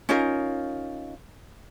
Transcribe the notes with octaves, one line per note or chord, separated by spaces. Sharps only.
C#4 D#4 F4 A#4